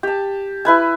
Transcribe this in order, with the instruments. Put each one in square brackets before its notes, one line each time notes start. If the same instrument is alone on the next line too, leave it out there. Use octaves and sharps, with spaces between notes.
[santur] G4 A5
E4 B4 G#5